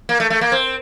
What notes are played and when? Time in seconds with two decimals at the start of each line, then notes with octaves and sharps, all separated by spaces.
0.09 A#3
0.20 A3
0.30 A3
0.41 A#3
0.52 C4